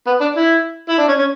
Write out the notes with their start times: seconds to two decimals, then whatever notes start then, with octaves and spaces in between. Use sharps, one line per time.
0.07 B3
0.21 D4
0.37 E4
0.89 E4
0.99 D4
1.08 C#4
1.19 C#4